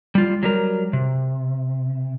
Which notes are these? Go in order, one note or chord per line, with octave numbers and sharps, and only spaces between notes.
G3 F4
F#3 G3 A#4
C3